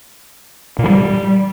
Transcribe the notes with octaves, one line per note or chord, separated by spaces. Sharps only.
A#2
E3
G3